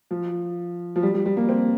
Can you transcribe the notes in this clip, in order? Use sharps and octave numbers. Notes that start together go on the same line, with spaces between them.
F3
F3
G3
G3
G3
A#3
C4